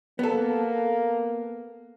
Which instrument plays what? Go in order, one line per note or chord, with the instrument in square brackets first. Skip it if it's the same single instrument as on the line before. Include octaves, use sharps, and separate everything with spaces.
[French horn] A#3 [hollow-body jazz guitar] B3 A4